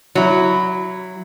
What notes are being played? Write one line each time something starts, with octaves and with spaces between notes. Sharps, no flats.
F#3 E4